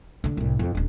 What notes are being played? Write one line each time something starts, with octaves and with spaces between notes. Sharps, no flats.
D3 D4
C2 A2
F2
D#1 D4